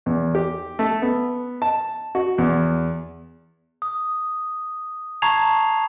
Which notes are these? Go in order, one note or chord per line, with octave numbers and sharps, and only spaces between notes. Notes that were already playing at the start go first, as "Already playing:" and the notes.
E2
G4
A3
B3
A5
F#4
E2
D#6
A5 A#5 C#6 G#6 C7 F7